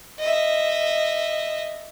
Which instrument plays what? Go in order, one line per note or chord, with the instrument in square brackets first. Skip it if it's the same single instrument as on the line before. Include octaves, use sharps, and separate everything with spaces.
[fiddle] D#5 E5